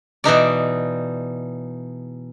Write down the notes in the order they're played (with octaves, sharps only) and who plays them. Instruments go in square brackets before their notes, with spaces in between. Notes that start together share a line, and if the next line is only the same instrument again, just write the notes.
[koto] B2 E3 D#4 D5